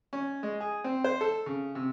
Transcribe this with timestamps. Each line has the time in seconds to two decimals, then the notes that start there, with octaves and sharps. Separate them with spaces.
0.13 C#4
0.43 G#3
0.60 G#4
0.84 C4
1.04 C5
1.21 A4
1.46 C#3
1.75 C3